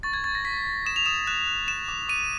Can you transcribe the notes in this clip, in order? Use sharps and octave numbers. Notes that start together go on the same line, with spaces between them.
C#6 A6
G#6
C#6 A6
A#6
C#6 B6
C#6
D#6 E7
F7
D#6 E7
F#6 E7
F#6
F#6 E7
D6
D6 D#7